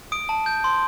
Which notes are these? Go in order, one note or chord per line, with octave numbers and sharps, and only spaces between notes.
D#6 D7
A5
G6
C6